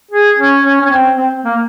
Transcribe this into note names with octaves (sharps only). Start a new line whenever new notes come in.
G#4
C#4
C#4
C#4
C4
C4
A#3